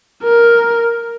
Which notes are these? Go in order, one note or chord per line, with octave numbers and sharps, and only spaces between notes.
A#4